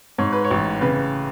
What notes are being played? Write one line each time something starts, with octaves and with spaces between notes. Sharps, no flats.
G#2 C#5
B4
C#5
A1
C#3 B4